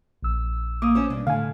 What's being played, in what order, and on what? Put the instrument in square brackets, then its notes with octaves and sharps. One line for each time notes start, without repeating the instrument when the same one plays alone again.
[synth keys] A#1 E6
[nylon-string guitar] A#3 [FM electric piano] D6 D#6
[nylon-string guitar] C#4 C5 C#5
[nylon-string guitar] G2 [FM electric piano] B2
[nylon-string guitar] A2 [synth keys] D3 [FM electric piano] F5 G#5